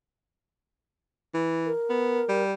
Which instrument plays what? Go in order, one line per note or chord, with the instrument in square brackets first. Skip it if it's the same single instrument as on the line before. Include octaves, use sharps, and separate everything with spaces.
[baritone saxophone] E3
[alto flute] A#4
[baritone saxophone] B3
G3